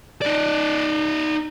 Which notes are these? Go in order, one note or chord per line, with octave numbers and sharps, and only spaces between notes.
D#4 D5